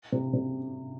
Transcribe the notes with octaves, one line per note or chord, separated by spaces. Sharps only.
C3
C3